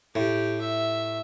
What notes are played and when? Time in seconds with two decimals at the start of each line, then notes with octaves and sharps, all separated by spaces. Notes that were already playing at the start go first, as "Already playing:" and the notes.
0.16 A2 G4
0.61 E5